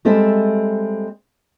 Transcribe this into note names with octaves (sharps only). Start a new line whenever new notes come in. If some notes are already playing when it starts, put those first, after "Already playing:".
G3 G#3 C4 A4 E5